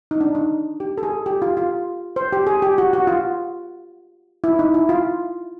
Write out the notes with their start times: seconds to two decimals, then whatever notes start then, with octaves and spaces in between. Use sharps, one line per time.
0.11 D#4
0.21 D4
0.35 D#4
0.80 G4
0.98 A4
1.03 G#4
1.26 G4
1.42 F4
1.57 F4
2.16 C5
2.32 G4
2.47 G#4
2.62 G4
2.78 F#4
2.93 F#4
3.07 F4
4.44 E4
4.59 D#4
4.74 E4
4.89 F4